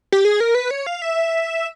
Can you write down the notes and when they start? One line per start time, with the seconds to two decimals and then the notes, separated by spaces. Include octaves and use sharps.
0.12 G4
0.25 G#4
0.40 A#4
0.55 B4
0.71 C#5
0.87 F5
1.02 E5